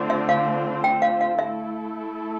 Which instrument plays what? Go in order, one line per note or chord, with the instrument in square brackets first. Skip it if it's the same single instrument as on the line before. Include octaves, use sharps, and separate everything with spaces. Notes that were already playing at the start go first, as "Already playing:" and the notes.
Already playing: [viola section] D3 A3 C4 F4 C5
[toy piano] E5
F5
G5
F5
F5
[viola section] A3 E4 A4 [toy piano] E5